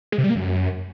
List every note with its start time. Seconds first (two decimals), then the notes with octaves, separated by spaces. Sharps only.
0.12 G#3
0.18 C3
0.24 G3
0.30 A#3
0.35 F#2